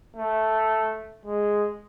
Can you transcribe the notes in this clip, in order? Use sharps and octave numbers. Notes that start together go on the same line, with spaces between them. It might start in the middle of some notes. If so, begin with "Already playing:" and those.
A3
G#3